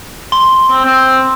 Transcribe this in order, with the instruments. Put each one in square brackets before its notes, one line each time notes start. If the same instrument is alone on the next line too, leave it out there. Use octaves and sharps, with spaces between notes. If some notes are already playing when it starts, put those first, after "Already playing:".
[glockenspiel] C6
[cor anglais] C4
C4